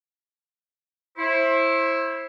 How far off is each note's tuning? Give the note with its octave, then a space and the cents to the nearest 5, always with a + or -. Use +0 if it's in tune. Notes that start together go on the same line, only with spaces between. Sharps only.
E4 +0 C5 +35